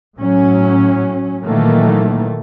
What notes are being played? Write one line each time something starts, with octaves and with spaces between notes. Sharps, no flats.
A2 F#3 C#4
A#2 D#3 E3 F#3 A3 A#3